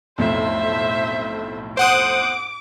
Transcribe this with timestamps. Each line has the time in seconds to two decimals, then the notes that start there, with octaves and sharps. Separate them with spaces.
0.18 B1 F2 A2 C5 E5
1.77 C5 F#5 D6 D#6